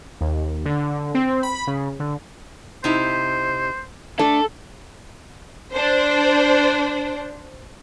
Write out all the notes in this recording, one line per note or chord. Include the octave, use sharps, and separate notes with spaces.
D#2
D3
C4
B5
C#3
D3
C3 D#4 E4 C5
A3 D4 A4
D4 C5